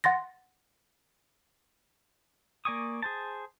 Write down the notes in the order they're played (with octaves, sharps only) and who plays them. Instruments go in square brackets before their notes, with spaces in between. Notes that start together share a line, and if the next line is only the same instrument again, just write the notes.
[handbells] F#5 C6 A6 A#6
[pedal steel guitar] A#3 D5 G#5 C#6 D#6
G#4 C5 A5